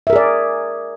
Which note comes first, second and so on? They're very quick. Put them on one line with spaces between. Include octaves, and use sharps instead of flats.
E5 A#4 G#4 D5